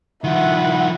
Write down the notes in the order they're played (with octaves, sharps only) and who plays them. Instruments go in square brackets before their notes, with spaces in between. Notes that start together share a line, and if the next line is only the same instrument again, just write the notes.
[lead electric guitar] D#3 F3 [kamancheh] E4 F#5